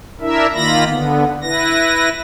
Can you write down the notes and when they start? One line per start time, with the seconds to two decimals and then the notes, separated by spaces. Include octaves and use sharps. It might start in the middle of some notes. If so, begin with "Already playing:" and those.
0.21 D4 E4 A#4 E5
0.54 D#3 A#3 F4 B5 A#6
0.85 D3 B3
1.42 E4 B4 A#6